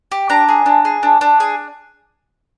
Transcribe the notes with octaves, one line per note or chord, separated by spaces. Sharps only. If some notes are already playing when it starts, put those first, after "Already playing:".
G4
D4 A#5
G#4
D4
G#4
D4
D4
G#4